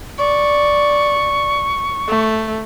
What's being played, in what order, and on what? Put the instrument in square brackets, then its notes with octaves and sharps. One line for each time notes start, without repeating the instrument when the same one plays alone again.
[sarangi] D5 [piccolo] C#6
[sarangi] A3